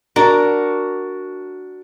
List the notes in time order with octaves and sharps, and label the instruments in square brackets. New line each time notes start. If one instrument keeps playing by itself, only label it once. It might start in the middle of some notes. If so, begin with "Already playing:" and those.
[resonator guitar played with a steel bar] D4 F#4 A#4